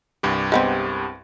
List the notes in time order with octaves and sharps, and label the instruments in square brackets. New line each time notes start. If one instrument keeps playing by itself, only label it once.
[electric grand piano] C2 G2 G4
[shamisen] G#3 B3 C4